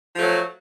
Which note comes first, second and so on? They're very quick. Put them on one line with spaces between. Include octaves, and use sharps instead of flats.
F3 A3 F#3